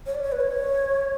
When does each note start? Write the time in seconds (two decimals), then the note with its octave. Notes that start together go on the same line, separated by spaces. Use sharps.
0.06 C#5
0.15 D5
0.23 C#5
0.32 B4
0.40 C#5